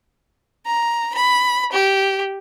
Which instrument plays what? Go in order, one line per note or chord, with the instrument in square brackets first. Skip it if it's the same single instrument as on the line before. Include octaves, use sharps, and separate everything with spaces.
[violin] A#5
B5
G4